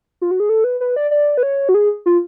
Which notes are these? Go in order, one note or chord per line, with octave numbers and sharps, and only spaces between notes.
F4
F#4
G#4
A4
B4
B4
D5
D5
B4
C#5
F#4
G#4
F4